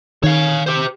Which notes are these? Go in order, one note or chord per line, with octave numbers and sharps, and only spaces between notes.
D#3 C#5 F5
G4 C5